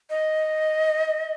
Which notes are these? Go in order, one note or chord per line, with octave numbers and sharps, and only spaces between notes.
D#5